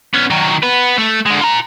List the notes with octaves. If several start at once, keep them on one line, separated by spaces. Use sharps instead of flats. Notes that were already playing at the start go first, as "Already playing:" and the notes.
B3 C#4
D#3 F#3
B3 B4
A3
D3 G#3
F4 A#5